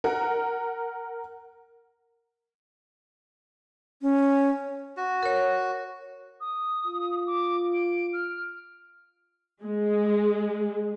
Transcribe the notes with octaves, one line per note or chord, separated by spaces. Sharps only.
A#4 F#5
C#4
F#4
A#4 C#5
D#6
F4
D6
D7
F6
G#3